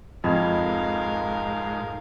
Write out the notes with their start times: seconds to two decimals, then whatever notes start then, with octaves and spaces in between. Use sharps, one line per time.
0.24 F2 G#2 A#4 D#5 F5 B5 G#6